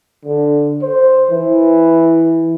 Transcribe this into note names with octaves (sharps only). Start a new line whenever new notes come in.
D3
C5
E3